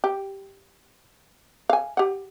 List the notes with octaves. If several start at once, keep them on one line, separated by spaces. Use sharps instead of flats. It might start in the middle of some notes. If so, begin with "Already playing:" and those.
G4
F5 G#5
G4 F#5